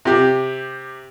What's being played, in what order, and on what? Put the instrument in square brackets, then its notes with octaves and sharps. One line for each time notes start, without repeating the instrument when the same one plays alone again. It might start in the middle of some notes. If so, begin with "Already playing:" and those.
[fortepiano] C3 G4